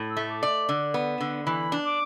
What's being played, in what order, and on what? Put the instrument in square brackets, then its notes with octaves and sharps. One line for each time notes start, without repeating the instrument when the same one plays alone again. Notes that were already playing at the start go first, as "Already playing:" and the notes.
Already playing: [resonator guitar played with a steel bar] A2
[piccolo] E6
[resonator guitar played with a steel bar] A3
[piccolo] D6
[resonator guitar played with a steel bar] D5
D3
B3
D3
[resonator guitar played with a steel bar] E3 [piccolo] B5
[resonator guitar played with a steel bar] D4
[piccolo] D6